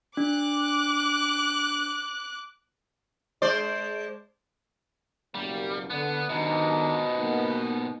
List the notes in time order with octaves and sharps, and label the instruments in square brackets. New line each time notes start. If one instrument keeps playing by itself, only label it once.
[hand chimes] D4 [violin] D6 F#6
[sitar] G#3 C5 D5
[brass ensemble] F#1 B2 A#3 [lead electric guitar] G3
[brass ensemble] D3 D4 [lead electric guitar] B3
[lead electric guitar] G#2 B2 [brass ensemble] D#3 D4 A#5 [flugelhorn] D#5
[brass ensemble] A#3 B3 D#4